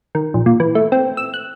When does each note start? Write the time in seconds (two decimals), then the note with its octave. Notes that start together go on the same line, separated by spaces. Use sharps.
0.15 D#3
0.34 A#1
0.46 A#2
0.60 E3
0.75 A3
0.92 C4
1.17 E6
1.34 F#6